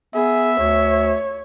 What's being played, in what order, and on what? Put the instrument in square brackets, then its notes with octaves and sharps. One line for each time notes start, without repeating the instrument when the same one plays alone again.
[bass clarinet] B3 [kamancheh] G#4 [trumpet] E5
[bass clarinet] D2 [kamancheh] C#5